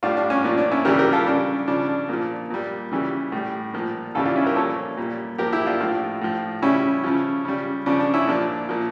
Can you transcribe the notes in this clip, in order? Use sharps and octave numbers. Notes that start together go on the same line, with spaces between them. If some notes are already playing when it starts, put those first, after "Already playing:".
A2 G3 D4 F4
D4
C#4
A#2 F3 D4
D4
C#4 E4
C#3 E3 G3 G4 A#4
G4 A#4
F4 A4
C#3 G3 D4
C#3 F3 D4
D4
A#2 F3
A#2 G3
C#3 E3 G3
A2 G3
A#2 F3
C#3 E3 G3 F4 A4
D4 F4
C#4 E4
G4 A#4
A#2 F3 A4 C#5
A#2 G3
A#2 F3 G4 A#4
E4 G4
D4 F4
A2 F3
A2 F3
C#3 G3 C#4 E4
C#3 F3
C#3 G3
C#3 F3 D4
D4
C#4 E4
A#2 F3 D4
A#2 F3